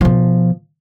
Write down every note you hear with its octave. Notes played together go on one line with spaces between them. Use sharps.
B2 F3